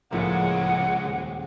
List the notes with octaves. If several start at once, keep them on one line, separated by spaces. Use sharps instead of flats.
C#2 A2 C#3 F3 G#3 A#3 F#5
D#1